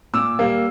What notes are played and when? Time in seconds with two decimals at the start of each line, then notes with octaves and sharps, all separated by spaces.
0.14 A#2 D6 E6
0.39 G3 A#3